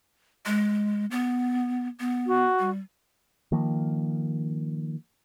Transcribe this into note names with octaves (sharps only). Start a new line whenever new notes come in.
G#3
B3
B3
F#4
G3
D#3 F3 A#3